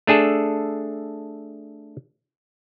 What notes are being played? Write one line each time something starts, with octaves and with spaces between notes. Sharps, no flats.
A3 D4 G#4 A4